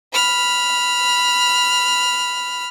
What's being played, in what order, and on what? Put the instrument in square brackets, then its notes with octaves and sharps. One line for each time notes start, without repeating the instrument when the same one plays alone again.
[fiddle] B5 F6